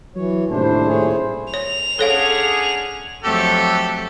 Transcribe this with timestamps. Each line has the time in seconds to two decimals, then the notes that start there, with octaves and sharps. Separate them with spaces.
0.16 E3 F#3 C#5
0.50 D#1 A2 C3 D4 E4 C5
0.87 A3 G#4 C#5
1.54 C#5 F7
1.99 D3 C#4 G#4 A4 C#5 F5
3.24 F2 F#3 A3 G4 A4